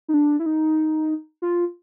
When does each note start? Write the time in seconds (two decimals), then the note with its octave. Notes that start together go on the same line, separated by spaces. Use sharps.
0.08 D#4
0.14 D4
0.40 E4
0.46 D#4
1.42 F4